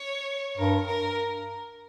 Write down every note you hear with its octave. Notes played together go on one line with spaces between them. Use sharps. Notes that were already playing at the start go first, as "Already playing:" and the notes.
Already playing: C#5
G2 A#4
A#4